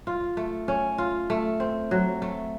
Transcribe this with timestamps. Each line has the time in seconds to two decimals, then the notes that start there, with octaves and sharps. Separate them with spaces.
0.07 F4
0.37 A3
0.68 C#4
0.98 F4
1.30 A3
1.60 C4
1.91 F#3
2.22 A3